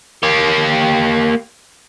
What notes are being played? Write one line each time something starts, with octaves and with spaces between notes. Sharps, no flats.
A#3 G4